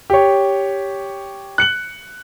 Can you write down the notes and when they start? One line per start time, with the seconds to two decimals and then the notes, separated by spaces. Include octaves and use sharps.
0.10 G4 C#5
1.58 F#6 C#7 F#7